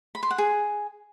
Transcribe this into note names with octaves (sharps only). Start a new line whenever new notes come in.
B5
C6
F#5
G#4